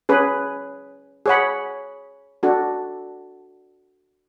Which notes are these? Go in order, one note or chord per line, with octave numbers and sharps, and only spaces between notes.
C#4 G#4 B4
G#4 C#5 F#5 B5
D4 F#4 A4